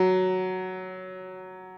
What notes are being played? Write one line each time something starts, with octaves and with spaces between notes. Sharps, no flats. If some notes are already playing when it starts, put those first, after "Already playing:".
Already playing: F#3